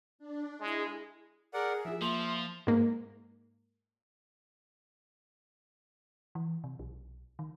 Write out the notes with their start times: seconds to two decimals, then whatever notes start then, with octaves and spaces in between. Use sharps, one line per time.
0.19 D4
0.60 G#3 E4 G#4
1.53 G#4 A#4 D5 F#5
1.85 F3 E4 E5
2.01 F3 A#3 C6
2.67 G#2 A#3
6.35 E3
6.64 C3
6.79 B1
7.39 D#3